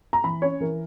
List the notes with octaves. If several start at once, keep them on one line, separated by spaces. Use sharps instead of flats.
A#5
E3 B5
C#4 C#5
E3 A#4